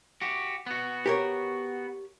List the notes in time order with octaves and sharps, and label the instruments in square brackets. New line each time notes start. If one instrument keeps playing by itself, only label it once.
[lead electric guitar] F#4 G4
B3 F#4
[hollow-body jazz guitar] G4 A#4 C#5